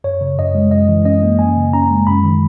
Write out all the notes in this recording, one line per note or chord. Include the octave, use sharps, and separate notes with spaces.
F#2 C#5
C#3
F#2 D#5
G#3
F#2 D#5
E3
C#4 D#5
A#3
F#2 G#5
C#3
C#4 A#5
G#3
F#2 B5
D#3